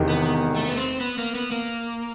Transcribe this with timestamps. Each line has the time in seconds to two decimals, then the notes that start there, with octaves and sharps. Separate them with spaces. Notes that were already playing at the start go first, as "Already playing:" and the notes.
Already playing: E1 E2 C3 D#3
0.09 B3
0.56 A3
0.69 B3
0.77 C4
1.00 B3
1.18 A#3
1.35 B3
1.52 A#3